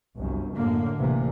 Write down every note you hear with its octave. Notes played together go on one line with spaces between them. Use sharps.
G1 C2 F#2
F#2 A2 D3 A#3
A1 C3 E3 A#3